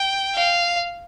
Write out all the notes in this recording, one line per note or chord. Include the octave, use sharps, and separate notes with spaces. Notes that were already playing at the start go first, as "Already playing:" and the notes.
Already playing: G5
F5